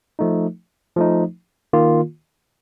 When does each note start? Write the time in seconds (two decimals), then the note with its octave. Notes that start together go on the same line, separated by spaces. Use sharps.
0.19 F3 A3 D#4
0.96 F3 A3 D#4
1.73 D#3 A#3 F4